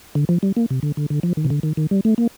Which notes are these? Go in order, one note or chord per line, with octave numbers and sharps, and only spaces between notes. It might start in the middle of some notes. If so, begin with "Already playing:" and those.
D3
F3
G3
A#3
C3
D3
D3
D3
F3
D#3
C3
D3
D#3
D#3
G3
A3
A#3